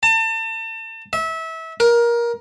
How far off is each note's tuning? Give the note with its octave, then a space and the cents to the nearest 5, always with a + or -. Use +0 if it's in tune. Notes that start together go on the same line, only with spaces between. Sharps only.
A5 +35
E5 -25
A#4 +20